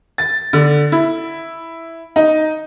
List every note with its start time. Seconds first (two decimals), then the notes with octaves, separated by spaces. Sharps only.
0.18 A6
0.53 D3
0.92 E4
2.16 D#4